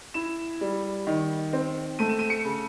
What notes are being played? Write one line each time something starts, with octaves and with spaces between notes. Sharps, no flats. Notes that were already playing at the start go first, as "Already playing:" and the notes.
E4 E7
G3
D#3
C4
A3 D#7
E7
D#7
C#7
C#3